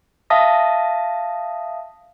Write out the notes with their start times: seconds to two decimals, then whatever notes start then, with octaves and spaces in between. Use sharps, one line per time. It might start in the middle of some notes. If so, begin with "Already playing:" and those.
0.30 E5 F5 A5 D#6 A#6